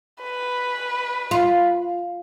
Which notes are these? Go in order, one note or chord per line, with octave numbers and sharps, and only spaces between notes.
B4
F4